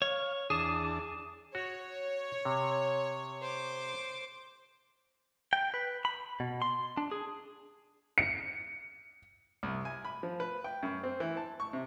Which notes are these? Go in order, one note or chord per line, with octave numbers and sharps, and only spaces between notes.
C#5 F5
E2 D4 G#4 A5 D#6 E7
F#4 C#5
C3
C5 D6
G5
B4
B5
B2
C6
D4
G#4
C#7
C2
G#5
B5
F3
B4
G5
F#2
C4
E3
A5
C#6
C3